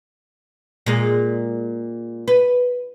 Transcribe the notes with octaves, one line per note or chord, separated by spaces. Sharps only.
A#2 G#3
B4